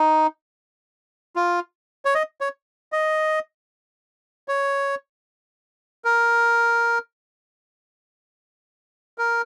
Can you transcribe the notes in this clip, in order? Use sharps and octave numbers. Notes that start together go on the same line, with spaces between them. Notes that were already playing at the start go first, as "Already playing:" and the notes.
Already playing: D#4
F4
C#5
D#5
C#5
D#5
C#5
A#4
A#4